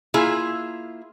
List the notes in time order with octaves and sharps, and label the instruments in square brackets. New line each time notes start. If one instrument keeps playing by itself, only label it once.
[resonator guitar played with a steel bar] A#3 E4 F4 G#4 E5